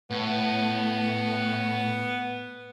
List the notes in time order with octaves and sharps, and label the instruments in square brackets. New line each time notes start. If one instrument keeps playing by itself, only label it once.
[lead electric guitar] A2 [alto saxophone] B3